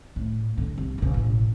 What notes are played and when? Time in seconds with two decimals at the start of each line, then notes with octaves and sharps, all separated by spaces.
0.16 A2
0.58 D3
0.78 C2
0.98 E1 C#3
1.14 A1